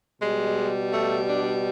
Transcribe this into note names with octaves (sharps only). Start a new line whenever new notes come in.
B2 G3 G#3
A3
D4